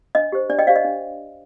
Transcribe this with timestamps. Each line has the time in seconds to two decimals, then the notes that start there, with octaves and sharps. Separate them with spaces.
0.15 D4 D#5
0.32 G4 C5
0.50 D4 D5
0.59 D#5 G5
0.67 G4 C5 D5 F5
0.76 D#5
0.85 D4